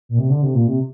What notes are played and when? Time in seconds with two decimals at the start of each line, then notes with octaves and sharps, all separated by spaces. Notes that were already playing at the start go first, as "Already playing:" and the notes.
0.09 A#2
0.19 C3
0.30 D3
0.42 C3
0.54 A#2
0.67 C3